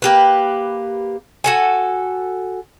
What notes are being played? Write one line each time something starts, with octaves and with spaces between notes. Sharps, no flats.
A#3 G4 B4
F#4 A4 G#5